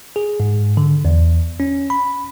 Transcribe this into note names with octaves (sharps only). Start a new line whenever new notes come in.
G#4
G#2
D3
E2
C#4
B5